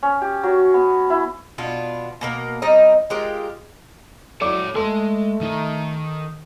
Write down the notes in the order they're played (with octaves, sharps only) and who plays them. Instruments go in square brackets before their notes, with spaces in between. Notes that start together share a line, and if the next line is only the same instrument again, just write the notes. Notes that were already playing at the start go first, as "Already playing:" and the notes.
[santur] C#4
G4
F#3
B3
E4
[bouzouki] B2 B3 D4 F4
B2 A#3 A#4
G3 C4 D#4 D#5
G#3 F4 G4 A#4
[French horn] F#3 [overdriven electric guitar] A4 C#5 [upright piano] D5 D6
[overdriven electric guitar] G#3 C6 [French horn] A3 [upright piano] A4
[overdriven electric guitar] D#3 D#4